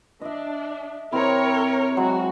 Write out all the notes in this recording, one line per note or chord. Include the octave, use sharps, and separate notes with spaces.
D4 D#5 E5
C3 C4 E4 A#4 C#5
F#3 G#3 F#4